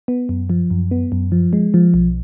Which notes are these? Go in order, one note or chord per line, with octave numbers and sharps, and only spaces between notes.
B3
F#2
F3
F#2
B3
F#2
F3
G#3
F3
B1